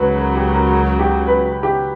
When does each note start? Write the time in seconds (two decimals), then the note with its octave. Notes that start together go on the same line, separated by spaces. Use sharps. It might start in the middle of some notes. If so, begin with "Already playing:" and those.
Already playing: C#2 C#3 F#3 B4
0.18 A#4
0.36 G4
0.54 A#4
0.72 A#4
0.99 G4
1.27 B4
1.63 G4